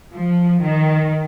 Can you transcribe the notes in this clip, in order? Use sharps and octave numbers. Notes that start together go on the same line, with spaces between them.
F3
D#3